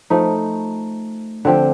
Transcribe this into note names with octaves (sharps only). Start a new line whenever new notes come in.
F3 A3 D#4
D3 F3 C4 G4